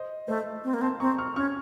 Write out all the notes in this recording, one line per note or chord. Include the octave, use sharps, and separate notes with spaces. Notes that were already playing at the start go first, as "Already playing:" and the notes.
Already playing: C5 D#5
A3 C5 D#5
C4
A#3
C4 A5 C6
C4 A#5 C#6
C#6 F6
C#4 C#6 F6